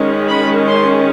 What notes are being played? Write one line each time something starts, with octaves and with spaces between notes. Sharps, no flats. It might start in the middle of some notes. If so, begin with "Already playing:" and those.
Already playing: D#3 G#3 C#4
B5
C6